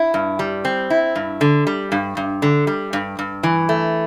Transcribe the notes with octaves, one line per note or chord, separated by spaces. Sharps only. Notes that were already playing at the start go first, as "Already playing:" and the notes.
Already playing: E4
G2
G3
C4
E4
G2
D3
G3
G2
G2
D3
G3
G2
G2
E3
A3